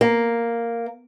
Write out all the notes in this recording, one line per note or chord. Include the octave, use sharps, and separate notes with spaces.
A#3